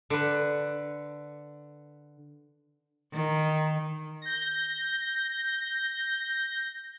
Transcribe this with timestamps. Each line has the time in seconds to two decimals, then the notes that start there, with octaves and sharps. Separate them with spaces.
0.10 D3 B4
3.13 D#3
4.22 G6 A#6